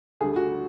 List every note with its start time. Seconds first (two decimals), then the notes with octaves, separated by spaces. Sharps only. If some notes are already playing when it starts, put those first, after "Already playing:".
0.20 D2 D3 G3 G#4
0.36 F#4